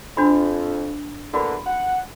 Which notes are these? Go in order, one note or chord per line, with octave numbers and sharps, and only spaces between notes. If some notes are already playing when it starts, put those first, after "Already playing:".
F2 D4 F#4 B5
E2 D3 A#3 F#4 B5
F#5